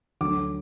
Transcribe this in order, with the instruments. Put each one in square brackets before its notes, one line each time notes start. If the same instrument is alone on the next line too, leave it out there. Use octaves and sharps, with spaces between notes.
[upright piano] D2 D3 F#3 D6